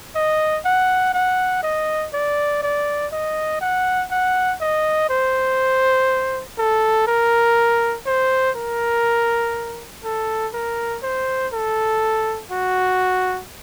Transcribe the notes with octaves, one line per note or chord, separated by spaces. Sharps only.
D#5
F#5
F#5
D#5
D5
D5
D#5
F#5
F#5
D#5
C5
A4
A#4
C5
A#4
A4
A#4
C5
A4
F#4